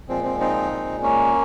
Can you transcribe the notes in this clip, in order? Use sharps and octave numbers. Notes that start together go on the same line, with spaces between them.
A#2 F3 G#3 C4
C4
C4 D#4
A#2 G#3
A#3 C#4